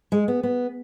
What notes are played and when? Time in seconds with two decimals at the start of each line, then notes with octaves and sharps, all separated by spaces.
0.12 G#3
0.28 B3
0.43 B3